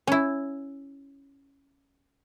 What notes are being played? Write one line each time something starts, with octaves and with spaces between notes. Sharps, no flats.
C#4 E4